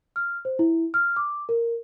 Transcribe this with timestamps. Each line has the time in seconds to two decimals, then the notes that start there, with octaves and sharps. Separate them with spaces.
0.16 F6
0.45 C5
0.59 E4
0.94 F6
1.17 D6
1.49 A#4